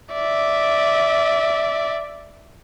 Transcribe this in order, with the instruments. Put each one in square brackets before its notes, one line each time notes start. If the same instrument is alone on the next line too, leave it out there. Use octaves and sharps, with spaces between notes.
[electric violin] D5 E5